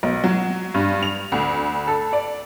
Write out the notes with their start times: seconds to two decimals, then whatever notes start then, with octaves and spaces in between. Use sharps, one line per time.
0.03 B1
0.24 F#3
0.74 G2
1.03 F7
1.32 D2
1.87 A4
2.13 D5